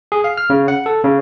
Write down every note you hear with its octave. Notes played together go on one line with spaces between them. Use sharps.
G#4
F5
F6
C#3
F#5
A4
C#3